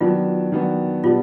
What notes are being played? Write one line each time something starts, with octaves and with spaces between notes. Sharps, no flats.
D#3 F#3 B3 D4 F4
D#3 F#3 B3 D4
B2 G3 B3 D4 F4